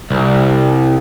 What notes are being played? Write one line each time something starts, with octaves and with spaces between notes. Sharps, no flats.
C2